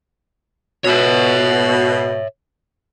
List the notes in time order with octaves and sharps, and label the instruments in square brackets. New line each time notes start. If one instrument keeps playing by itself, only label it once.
[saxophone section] B2 [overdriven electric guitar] C#5 E5